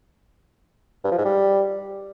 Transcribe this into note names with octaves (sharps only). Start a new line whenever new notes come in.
G2
F3
G#2
G3